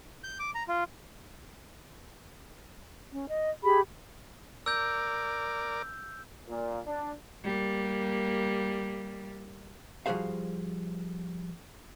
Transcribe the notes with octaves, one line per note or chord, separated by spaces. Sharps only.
G6
D6
A#5
F4
C#4
D#5
G4 G#4 B5
A#4 D5 E6 G6
A#2
D4
G3 A#3
F3 G3 F#4 G#4 C5 F5